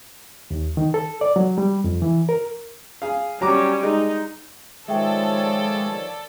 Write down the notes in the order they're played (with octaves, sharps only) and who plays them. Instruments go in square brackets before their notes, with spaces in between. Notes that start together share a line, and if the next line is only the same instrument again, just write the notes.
[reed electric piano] D#2
D#3
A4
D5
F#3
G3
F2
E3
A#4
[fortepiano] G#4 F5
[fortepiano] F#3 A#5 D6 [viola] G3 C#4
[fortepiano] G#3 [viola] D#4
[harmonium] D#3 F3 C#5 [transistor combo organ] G#3 [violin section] A4 D5 [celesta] E5 G5